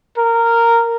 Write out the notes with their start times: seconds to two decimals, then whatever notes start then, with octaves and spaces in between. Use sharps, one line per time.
0.17 A#4